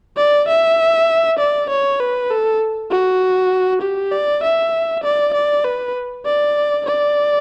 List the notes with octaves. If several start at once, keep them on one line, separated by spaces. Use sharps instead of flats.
D5
E5
D5
C#5
B4
A4
F#4
G4
D5
E5
D5
D5
B4
D5
D5